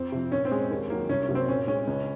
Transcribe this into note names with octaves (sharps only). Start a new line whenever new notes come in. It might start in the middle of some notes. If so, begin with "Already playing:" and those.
Already playing: F2 C4
C3 F3
A#2 C#4
C4
G#3
D#2
D#3 F#3 A#3
C2 C#4
C#4
C3 F#3 A#3
C4
A#2 C#4
G#3 C#4
C#2